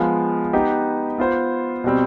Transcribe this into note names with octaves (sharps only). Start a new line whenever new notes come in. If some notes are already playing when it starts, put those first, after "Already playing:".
Already playing: F3 G#3 B3
B3 D#4 G4 B4
B3 F4 C5
B2 G3 C4